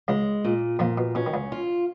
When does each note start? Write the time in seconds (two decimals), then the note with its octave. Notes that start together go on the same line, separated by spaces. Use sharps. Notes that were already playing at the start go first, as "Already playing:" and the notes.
0.08 C#2 C#3 G#3
0.45 A#2
0.79 F2 A#2 F3
0.98 B2
1.15 B2 C#4
1.26 D#3
1.34 C#2 C#3
1.52 F4